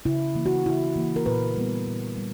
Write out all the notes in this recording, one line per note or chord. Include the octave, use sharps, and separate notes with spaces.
C#3 E4
E3 A#3
F#4
C#3 E4
E3 A#3
A#4
A#2 B4
G3 B3
A#2
G3